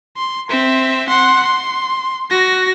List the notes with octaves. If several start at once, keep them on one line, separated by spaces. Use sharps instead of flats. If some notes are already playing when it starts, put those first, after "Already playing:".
C6
C4 E5
F#5 C6
C6
F#4 A#6